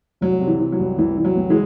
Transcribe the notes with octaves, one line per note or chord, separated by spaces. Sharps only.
C2 F#3
C3
E3
E3
F#3
C2
C2 E3
E3
F#3
C2
E3 G#3